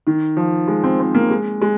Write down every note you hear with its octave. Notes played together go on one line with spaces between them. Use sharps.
D#3
F3
G#3
C4
C4
A#3
G#3
G#3